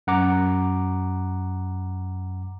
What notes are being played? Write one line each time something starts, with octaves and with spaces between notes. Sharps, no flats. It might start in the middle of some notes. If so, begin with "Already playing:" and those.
F#2 F#5 A#5 D6